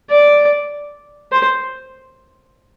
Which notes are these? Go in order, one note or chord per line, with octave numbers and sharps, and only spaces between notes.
D5
C5